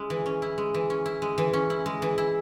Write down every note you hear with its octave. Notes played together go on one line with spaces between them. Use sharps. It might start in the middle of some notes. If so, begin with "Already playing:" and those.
Already playing: G#3 C#4 E4
E3
C#4
E4
G#3
E3
C#4
E4
G#3
E3
C#4
E4
G#3
E3
E4